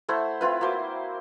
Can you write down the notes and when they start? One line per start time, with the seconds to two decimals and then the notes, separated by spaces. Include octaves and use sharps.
0.09 A3 E4 C5 F#5
0.41 C4 E4 F4 B4
0.61 A#3 F#4 C5 D6